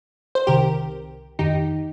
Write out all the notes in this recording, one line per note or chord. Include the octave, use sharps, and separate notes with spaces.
C5
C2 C3 D#3 G4 A#4
F2 D#3 D#4 G4